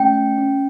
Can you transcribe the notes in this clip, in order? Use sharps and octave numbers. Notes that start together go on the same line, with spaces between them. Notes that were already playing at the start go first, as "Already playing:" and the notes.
Already playing: A3 C#4 G5
C#4